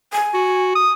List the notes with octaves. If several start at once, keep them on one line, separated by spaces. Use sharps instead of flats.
G#5
F#4
D#6